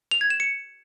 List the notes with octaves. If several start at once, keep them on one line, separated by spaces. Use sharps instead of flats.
F7
G#6
E7
C#7